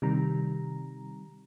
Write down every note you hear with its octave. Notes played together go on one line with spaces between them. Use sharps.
C3 D#3 G3 A#5